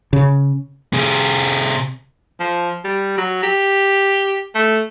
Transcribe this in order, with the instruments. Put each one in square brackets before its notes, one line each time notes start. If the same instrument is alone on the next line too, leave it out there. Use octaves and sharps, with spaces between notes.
[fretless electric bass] C#3
[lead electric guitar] C3 G#4
[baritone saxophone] F3
G3
F#3
G4
A3